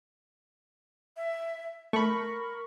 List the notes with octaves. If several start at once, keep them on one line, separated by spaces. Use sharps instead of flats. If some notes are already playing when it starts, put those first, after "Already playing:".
E5
A3 A#4 B5 C#6